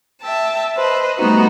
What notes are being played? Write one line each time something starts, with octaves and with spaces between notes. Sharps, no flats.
E5 G5 A5
B4 C5 D#5
G3 A3 B3 D#4 F#4